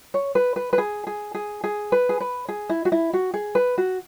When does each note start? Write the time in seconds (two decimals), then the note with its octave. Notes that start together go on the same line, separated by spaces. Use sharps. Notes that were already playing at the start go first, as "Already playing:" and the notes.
0.14 C#5
0.35 B4
0.56 B4
0.73 B4
0.78 G#4
1.07 G#4
1.35 G#4
1.64 G#4
1.92 B4
2.09 G#4
2.20 B4
2.49 G#4
2.69 E4
2.85 F#4
2.92 E4
3.13 F#4
3.34 G#4
3.55 B4
3.78 F#4